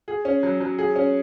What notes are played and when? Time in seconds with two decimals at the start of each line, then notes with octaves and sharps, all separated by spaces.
0.08 G#4
0.25 C#4
0.43 F#3
0.60 F#3
0.78 G#4
0.96 C#4